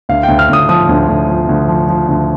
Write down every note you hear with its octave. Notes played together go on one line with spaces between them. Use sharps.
D2 F5
G5
D2
F6
D2 D#6
F3 D#6
D2
D2
F3
D2
F3
F3
D2